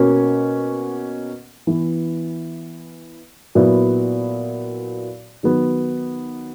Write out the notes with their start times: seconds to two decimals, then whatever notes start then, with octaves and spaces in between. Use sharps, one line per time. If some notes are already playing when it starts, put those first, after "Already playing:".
Already playing: B2 A#3 C#4 F#4
1.67 E3 B3 E4
3.55 A#2 F#3 B3 E4
5.43 D#3 F#3 B3